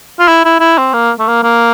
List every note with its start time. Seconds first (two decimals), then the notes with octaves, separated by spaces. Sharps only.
0.20 F4
0.28 E4
0.45 E4
0.60 E4
0.78 C4
0.94 A#3
1.19 A3
1.28 A#3
1.43 A#3